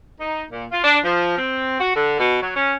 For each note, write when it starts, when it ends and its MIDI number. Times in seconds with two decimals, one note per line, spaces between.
0.20 0.43 63
0.51 0.65 46
0.72 0.80 65
0.84 0.99 62
1.05 1.37 53
1.38 1.80 60
1.80 1.93 66
1.96 2.18 50
2.19 2.41 47
2.43 2.55 54
2.56 2.74 61